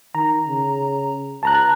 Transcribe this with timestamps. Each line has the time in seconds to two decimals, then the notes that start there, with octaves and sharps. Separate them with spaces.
0.15 D#3 A#5
0.47 C#3
1.43 C#2 A5 A#5 F#6